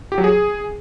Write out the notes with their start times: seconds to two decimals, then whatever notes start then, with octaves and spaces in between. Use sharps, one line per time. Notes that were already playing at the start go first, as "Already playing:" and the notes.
0.12 G4
0.18 F#3
0.24 G#4